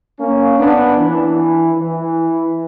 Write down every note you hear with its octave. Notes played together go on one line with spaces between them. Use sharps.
A#3 C#4
B3 D4
E3
E3